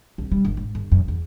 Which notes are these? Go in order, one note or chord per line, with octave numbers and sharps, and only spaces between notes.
C2
G3
G1
G#2
G1
F#2
E2